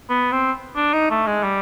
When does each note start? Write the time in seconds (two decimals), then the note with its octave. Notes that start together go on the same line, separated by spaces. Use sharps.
0.09 B3
0.32 C4
0.76 D4
0.93 D#4
1.10 A3
1.27 G#3
1.43 G3